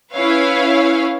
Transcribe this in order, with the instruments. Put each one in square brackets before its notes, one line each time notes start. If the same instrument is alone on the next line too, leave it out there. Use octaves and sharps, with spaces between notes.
[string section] C#4 E4 B4 C#5 F5